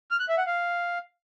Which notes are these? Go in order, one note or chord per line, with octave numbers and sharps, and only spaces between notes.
F6
F#6
E5
F#5
F5